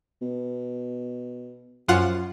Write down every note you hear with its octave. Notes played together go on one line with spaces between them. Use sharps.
B2
F#2 F3 F4 F#5